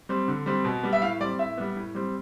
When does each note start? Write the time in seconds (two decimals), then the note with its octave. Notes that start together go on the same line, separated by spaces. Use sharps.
0.09 G3 C4
0.28 D3
0.46 G3 C4
0.64 B2
0.83 G3 B3
0.93 E5
1.02 A2 F5
1.20 G3 C4 D5
1.39 A2 E5
1.57 G3 B3
1.76 A2
1.95 G3 C4